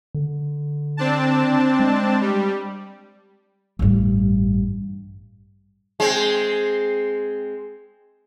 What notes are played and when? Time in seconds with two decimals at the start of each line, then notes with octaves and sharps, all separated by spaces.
0.15 D3
0.97 C4 D4 A5
1.80 G#3
2.21 G3
3.79 A1 G2
6.00 G#3 C4